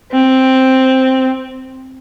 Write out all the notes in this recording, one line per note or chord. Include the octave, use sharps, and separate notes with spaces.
C4